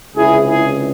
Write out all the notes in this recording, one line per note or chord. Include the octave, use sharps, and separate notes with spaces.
C#2 C3 E3 E4 G#4
E4 G#4